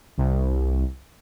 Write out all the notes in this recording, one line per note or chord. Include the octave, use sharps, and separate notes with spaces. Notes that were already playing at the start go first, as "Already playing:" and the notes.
C2